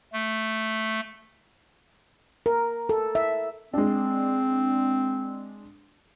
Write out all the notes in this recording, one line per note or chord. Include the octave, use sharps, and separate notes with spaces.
A3
A#4
A4
E5
G#3 C4 D4